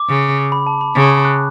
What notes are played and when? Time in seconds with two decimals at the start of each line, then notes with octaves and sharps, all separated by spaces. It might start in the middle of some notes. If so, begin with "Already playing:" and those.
Already playing: D6
0.09 C#3
0.52 B5
0.67 A5
0.81 B5
0.96 C#3 D6
1.25 F#6